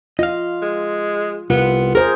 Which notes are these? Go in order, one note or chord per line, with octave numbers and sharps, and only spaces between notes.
F4 D#5 F5
G#3
C2 B3 F4
G#4 A#4 C5